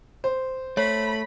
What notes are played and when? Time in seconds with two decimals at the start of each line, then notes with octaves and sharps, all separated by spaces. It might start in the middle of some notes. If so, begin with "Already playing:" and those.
0.24 C5
0.77 A3 C#5 B5